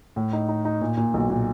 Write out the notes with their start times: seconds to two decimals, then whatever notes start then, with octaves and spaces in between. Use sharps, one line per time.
0.16 A2
0.33 D#4
0.48 D#4
0.65 D#4
0.81 A#2
0.97 A#2
1.14 B1
1.30 A#2